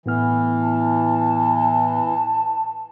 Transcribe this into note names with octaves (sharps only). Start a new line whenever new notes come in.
A2 E3 B3 F6
A5